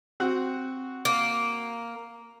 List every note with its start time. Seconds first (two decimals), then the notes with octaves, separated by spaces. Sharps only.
0.20 C4 F#4 F#5
1.05 A#3